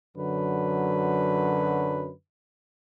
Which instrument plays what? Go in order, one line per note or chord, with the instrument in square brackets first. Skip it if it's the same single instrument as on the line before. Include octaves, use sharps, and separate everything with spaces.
[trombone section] F#2 D3 F#3 B4